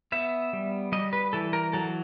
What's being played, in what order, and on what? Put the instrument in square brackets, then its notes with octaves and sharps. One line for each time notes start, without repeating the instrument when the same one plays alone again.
[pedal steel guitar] B3 E5
G3
G3 D#5
B4
E3 A4
A#4
F#3 A4